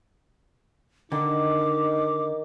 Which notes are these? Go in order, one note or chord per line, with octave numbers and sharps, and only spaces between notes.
D3 D#3 D#4 D6